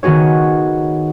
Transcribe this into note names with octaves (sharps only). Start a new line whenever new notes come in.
D#3 B3 F#4 G#4 C#5